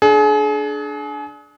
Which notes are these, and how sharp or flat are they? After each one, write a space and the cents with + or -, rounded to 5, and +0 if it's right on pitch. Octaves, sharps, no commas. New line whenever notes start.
D4 +0 G#4 +35